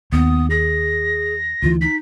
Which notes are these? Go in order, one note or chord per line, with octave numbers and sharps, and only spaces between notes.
D#2 B3 D#6
G#4 A#6
D2 E3 F4
D#4 B6